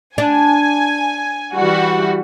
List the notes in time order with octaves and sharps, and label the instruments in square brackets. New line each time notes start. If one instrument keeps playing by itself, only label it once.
[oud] D4 [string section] G#5
[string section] E3 G3 F#4